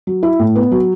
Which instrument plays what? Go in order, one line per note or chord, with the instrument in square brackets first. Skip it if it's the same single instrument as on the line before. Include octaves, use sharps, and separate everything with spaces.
[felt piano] F#3
E4
A2
B3
F#3